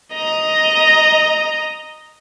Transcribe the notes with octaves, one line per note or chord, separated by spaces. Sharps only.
D#5 A#5